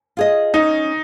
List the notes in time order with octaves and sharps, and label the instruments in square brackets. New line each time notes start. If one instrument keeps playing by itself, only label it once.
[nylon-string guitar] F4 G#4 D#5
[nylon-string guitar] C#4 [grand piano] D#4